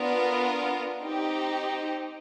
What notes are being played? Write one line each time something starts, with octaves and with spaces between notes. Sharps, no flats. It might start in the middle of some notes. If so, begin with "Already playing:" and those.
Already playing: B3 D4 F4 A#4
C4 D#4 G4